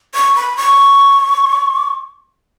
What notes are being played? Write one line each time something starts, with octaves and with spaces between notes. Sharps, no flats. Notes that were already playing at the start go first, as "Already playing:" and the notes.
C#6
B5
C#6